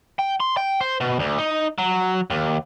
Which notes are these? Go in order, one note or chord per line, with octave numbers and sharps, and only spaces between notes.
G5
C6
G5
C5
B2
D2
D#4
F#3
D#2